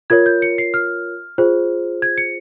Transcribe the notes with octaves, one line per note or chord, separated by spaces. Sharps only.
F4 A#4 C#5 G#6
G6
C#7
C7
F6
F4 G#4 C5
G#6
C#7